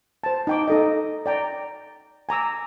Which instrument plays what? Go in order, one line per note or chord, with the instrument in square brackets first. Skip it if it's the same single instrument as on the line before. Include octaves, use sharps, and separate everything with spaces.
[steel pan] C5 A5
D#4 G5 D6
D#4 A4 D#5
D5 G5 A#5
G#5 A#5 D6 E6